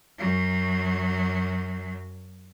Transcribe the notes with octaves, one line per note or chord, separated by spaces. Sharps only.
F#2 F#3